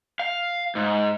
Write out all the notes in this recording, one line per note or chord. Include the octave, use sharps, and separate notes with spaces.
F5
G#2